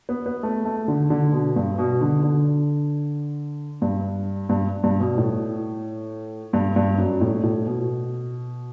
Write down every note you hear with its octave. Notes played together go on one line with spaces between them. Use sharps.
B3
B3
A3
A3
D3
D3
B2
G2
B2
D3
D3
G2
G2
G2
B2
A2
G2
G2
F#2
A2
A2
B2